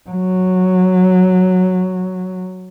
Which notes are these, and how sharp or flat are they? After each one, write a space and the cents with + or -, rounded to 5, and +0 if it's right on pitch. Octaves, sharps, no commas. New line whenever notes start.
F#3 -5